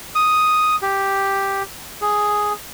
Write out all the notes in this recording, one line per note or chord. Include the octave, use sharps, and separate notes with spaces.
D#6
G4
G#4